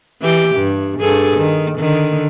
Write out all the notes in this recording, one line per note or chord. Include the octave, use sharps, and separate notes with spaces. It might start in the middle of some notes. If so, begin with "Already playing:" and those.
E3 G4
G2
G2 G#4 A4
D#3
D3 D#3